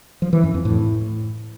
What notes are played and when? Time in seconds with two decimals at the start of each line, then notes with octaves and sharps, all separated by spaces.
0.22 F3
0.33 E3
0.43 F#2
0.54 F2
0.65 A2